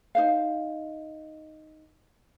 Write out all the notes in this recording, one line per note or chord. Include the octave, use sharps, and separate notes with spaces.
D#4 C5 F5